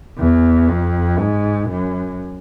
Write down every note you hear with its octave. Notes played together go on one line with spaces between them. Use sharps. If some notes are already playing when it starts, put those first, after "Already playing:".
E2
F2
G#2
F#2